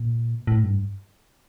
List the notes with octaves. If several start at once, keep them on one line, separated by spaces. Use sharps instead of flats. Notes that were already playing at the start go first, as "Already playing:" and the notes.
Already playing: A#2
A2
G2